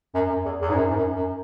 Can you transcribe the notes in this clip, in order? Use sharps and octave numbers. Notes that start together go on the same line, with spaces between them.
F#2
F#2
E2
E2
G#2
F#2
G#2
F#2
F#2